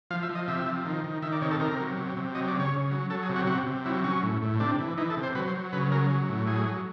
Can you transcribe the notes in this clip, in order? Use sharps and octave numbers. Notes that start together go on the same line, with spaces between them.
F3 F5
E5
F3
D#5
C3 E5
F3
D#3
D#3
D#3 E5
D5
C3 C#5
A4
C3 A#4
F#3
C3
C3
F#3 D#5
D5
C#3
C#5
C#3
F#3
F#3 A4
G#4
C3
F#4
C3 F#4
C3
F#3 E4
F#3 C#4
A2
A2
C3 D4
E3
E3 D#4
A4
C3
C5
F#3 B4
C5
F#3
C#3 B4
F#3 A#4
F#3
A2
F#3 G#4
F#3